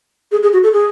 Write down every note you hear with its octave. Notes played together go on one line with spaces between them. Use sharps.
G#4
G#4
F#4
A4
G#4